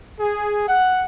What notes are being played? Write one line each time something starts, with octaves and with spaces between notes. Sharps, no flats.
G#4
F#5